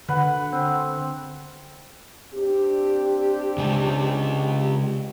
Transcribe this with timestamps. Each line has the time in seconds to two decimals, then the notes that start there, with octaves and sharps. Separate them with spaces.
0.09 D3 B4 F#5
0.52 C4
2.34 C4 D4 G4
3.58 C#3 G#3